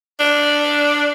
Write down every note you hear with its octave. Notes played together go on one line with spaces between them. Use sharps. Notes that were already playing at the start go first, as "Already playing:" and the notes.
D4